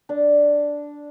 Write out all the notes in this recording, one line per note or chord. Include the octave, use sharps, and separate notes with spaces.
D4